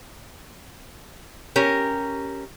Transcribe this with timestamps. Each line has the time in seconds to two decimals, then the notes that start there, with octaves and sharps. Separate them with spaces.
1.56 C#4 G4 A#4